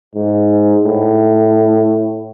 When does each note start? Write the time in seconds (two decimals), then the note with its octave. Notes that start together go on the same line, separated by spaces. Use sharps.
0.15 G#2
0.84 A2